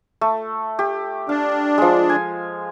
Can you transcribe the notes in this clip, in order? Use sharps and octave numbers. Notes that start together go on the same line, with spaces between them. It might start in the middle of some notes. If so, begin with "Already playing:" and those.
A3
G4
D4 F5
F3 G#3
G#5